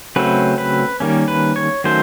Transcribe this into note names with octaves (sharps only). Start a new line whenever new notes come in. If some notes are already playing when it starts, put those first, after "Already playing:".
C#3 F#3 A3 C4 B4
B4
D#3 G3 A#3 C#4
B4
C#5
D#3 F#3 A3 C#4 C5